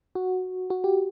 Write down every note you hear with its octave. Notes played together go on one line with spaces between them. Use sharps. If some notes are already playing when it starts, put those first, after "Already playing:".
F#4
F#4
G4